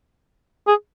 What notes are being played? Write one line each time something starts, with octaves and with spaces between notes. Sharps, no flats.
G#4